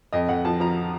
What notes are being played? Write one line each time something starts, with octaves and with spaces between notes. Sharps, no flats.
F2 D#5
F2 F#5
F3 A5
F3 A#5